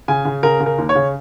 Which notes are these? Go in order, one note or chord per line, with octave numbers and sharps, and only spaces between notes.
C#3 G#5
C#3
C#3 A#4
C#3
A#4
D#2
C#5
C#3